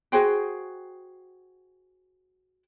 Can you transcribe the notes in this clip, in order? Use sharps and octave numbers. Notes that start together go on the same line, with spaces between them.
F#4 G#4 C5 G5